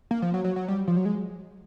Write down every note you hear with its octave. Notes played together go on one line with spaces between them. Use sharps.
A#3
F3
F#3
F#3
F#3
G3
F3
F#3
G#3